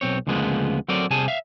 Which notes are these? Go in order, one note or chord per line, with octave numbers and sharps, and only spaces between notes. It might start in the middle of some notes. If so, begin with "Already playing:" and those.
B1 C4 C#5
D2 C#3 F3 G#3 A#3 B3
F#3 C4 A4 A#4 D5
C3 G3 G#4 G#5 A5
E5 F5